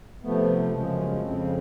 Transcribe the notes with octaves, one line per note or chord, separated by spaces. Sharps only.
C3 F3 A3 B3
F#2 C#3 F3 G#3
F2 C#3 F3 C4